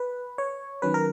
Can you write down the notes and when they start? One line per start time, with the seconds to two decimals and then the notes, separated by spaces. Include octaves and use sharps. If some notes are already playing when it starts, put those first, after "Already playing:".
Already playing: B4
0.38 C#5
0.82 D#3 F#3 C#4 B4
0.94 A#4